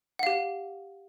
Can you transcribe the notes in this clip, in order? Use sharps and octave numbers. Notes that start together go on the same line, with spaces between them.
G4 F5 F#5